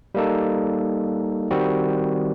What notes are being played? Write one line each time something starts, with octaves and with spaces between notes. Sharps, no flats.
G3 A#3 D#4 A4
D#3 G3 C4 F#4